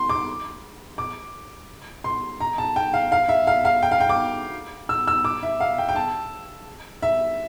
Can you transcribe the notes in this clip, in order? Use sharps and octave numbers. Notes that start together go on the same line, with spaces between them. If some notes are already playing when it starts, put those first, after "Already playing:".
Already playing: C6
D6
D6
C6
A#5
A5
G5
F5
F5
E5
F5
F5
G5
F5
G5
D6
E6
E6
D6
E5
F5
G5
G5
A5
E5